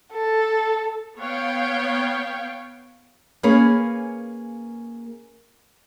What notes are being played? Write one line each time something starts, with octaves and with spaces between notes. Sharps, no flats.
A4
B3 C#5 F5 G5
A#3 C#4 G#4 A#4 B4 F5